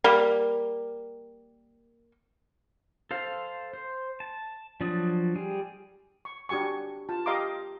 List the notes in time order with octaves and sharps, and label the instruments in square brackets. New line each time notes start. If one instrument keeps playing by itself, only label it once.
[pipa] G3 A#3
[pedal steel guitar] A4 C5 F5
C5
A5
F3 F#3 D4 D5 D#6
G3 G#4
[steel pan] C#6
D4 F#4 G4 G#5 C#6
F4 A5
G4 D#5 F5 A#5 C6 D6